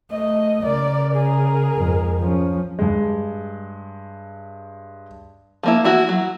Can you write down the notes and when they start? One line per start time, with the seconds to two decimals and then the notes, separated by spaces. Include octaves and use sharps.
0.11 A3 D#5
0.65 C#3 A#4 D5
1.13 G#4 A#4
1.76 F2 G#2
2.19 F3 C#4
2.79 G2 G#3
5.63 F3 A#3 E4
5.84 E3 E4 F#4
6.09 F#3